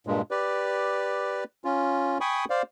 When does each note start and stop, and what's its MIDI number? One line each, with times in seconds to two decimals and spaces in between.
0.07 0.22 43
0.07 0.22 46
0.07 0.22 56
0.31 1.44 67
0.31 1.44 71
0.31 1.44 74
1.65 2.18 61
1.65 2.18 65
2.21 2.45 79
2.21 2.45 80
2.21 2.45 83
2.21 2.45 85
2.21 2.45 87
2.50 2.62 72
2.50 2.62 74
2.50 2.62 77